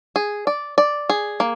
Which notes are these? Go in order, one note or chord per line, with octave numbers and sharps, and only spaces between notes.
G#4
D5
D5
G#4
A#3